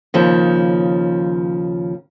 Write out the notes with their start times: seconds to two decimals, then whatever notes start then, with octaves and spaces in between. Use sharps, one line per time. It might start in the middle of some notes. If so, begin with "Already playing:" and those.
0.14 D#2 C#3 F3